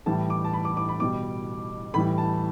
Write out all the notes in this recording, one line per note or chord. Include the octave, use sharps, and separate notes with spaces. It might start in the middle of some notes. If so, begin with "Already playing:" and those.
A2 E3 G3 A5
D6
A5
B5
D6
D6
B5
B2 G3 D6
A2 E3 G3 B5
A5